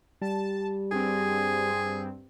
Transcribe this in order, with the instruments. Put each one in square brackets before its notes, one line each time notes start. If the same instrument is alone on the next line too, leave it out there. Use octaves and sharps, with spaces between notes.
[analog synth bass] G3 [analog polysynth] A5
[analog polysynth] G2 C4 [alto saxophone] G#4